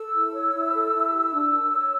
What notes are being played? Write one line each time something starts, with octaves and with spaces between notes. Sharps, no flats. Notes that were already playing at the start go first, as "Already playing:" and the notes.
Already playing: A4 E6
E4
C#5
E4
A4
E4
G4
D4
A#4
C#5